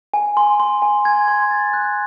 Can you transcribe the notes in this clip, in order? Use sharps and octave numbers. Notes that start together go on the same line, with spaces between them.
G#5
C6
C6
G#5
G#6
C6
A6
F#6